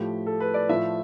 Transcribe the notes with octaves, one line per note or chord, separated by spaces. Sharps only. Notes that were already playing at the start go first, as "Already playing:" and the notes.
Already playing: A2 F3 A3 G4
A4
B4
D5
A2 F3 A3 E5